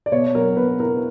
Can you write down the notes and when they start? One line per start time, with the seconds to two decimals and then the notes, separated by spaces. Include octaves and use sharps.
0.06 D5
0.12 B2 C#5
0.35 F#3 A#4
0.57 B2 B4
0.80 E4 A#4